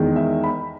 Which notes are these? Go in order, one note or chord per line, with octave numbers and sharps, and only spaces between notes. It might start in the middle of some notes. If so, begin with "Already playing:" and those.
Already playing: E2 D#3 G#3
E5
B5